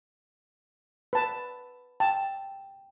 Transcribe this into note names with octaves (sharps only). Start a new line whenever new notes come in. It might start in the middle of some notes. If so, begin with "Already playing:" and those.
B4 A5
G5 A5